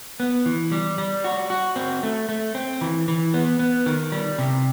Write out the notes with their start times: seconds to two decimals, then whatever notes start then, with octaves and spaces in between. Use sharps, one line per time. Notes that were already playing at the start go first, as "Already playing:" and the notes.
0.20 B3
0.46 E3
0.72 G3
0.98 G3
1.24 F#4
1.50 F#4
1.76 C4
2.03 A3
2.29 A3
2.55 C4
2.81 E3
3.08 E3
3.34 B3
3.59 B3
3.86 D#3
4.12 G3
4.39 C3